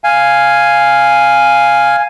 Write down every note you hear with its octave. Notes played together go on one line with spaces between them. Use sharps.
F5 G#5